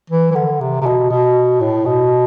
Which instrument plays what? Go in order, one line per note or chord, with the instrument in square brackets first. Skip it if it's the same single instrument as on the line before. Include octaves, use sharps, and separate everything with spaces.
[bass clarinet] E3
E3
D3
C3
C3
B2
B2
A2
B2